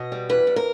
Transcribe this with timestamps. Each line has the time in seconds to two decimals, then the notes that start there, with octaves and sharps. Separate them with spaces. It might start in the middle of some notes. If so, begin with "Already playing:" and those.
Already playing: B2 D#5
0.12 G3
0.29 E2 B4
0.47 E2
0.56 A#4